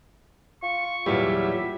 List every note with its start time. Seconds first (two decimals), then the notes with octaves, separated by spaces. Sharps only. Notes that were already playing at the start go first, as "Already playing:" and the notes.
0.63 F4 C#6
1.06 E2 A#2 F#3 G3 E5